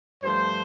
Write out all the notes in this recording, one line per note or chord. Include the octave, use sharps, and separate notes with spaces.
G2 F3 A3 C5